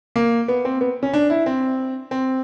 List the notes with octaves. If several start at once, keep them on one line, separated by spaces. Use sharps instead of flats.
A#3
B3
C4
B3
C#4
D4
E4
C4
C4